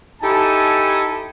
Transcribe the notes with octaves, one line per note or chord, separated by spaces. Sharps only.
D#4 E4 G4 A4 G#5 A5